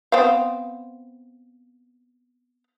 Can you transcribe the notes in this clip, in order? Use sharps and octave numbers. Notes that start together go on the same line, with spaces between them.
B3 C4 F5